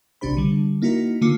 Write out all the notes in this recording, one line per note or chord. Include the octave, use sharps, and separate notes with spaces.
B1 C3 D4 G4 C5 B5
D3 G3
A#3 D#4 E4 F#4 A#4
D3 A3 A#3 F4 D6 C#7